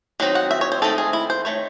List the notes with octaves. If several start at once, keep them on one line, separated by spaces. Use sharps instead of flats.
D#3 F#3 C4 D#4
F#5
E5
C#5
C5
D#3 A3 C4 D#4 A4
G#4
E4
C5
D#3 A3 C#5